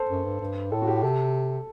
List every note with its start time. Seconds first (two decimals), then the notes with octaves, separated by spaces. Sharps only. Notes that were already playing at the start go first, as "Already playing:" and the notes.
Already playing: A4 C5
0.09 F#2
0.25 G2
0.40 G2
0.72 A2 A4
0.82 F#4
0.88 G4
1.03 C3 A4